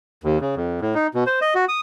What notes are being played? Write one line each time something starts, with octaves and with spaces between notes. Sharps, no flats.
D#2
C#3
F2
A2
D#4
B2
C5
D#5
F#4
D#6